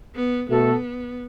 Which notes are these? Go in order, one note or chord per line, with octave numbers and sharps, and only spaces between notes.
B3
B2 A3 B3 F#4 A4